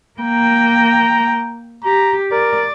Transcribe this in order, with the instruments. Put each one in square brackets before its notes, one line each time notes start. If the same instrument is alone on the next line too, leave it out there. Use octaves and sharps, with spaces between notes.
[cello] A#3 G5 [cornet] A#5
[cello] G4 [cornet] A#5
[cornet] A#4 [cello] D5